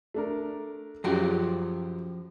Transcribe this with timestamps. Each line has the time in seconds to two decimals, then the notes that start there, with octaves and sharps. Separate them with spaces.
0.14 A3 D4 A#4
1.04 F#2 C#3 F3 F#4 G4